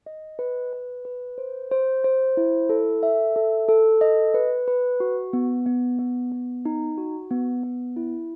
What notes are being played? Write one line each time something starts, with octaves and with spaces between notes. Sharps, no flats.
D#5
B4
B4
B4
C5
C5
C5
E4
A4
E5
A4
A4
D#5
B4
B4
F#4
B3
B3
B3
B3
D#4
F#4
B3
B3
E4